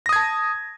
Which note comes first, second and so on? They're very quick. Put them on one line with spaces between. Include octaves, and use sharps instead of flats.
A#6 D#6 G#6 A5